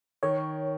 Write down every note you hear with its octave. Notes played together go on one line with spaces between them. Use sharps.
D#3 C#5